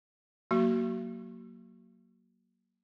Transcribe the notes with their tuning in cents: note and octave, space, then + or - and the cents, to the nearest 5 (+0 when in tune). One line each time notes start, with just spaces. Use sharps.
F#3 +0 A#3 +0 F#4 +25